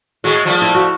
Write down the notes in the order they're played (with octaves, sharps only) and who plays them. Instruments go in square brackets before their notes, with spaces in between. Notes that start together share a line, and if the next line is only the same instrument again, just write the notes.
[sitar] A2 G#3 [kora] F#4
[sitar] F3 G3 A3
[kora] E4
F#4